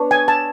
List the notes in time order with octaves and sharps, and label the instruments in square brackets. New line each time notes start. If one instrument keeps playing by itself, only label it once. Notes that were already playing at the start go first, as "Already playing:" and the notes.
Already playing: [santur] B3 D4 C#5
[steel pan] G#5
A5